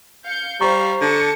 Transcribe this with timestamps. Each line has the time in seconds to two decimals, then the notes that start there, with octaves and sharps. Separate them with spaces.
0.23 F5 G6 C#7
0.61 G3 C5 F5 A#5 C#6
1.01 D3 A5 C#7